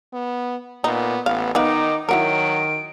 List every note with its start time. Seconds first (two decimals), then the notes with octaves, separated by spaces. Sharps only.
0.13 B3
0.84 A#2 B3 D#4
1.26 A1 B3 F5
1.55 D#3 B3 D#4 B4 F5 D6
2.09 D#3 F#3 E4 F#4 A#4 D7